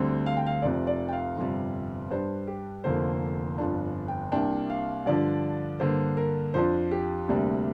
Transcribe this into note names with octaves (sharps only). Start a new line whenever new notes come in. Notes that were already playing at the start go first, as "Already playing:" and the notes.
Already playing: D2 D3 G3 C4
F5
G5
F5
F1 F2 C3 D5
D5
G5
F5
G1 F2 C3 G3
G2 G3 D4 C5
G4
F1 F2 D3 A#3 C5
G1 F2 F3 D4
G5
C2 C3 A#3 D4 G5
F5
G2 D3 F3 D4 D5
G2 D3 A#3 C5
A#4
F2 F3 D4 C5
G4
D2 C3 G3 A#3 D4